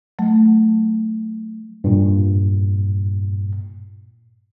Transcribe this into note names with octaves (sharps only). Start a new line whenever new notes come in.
F#3 A3
G2 A#2